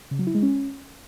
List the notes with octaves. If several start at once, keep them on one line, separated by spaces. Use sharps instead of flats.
C#3
F#3
E4
G#3
C#4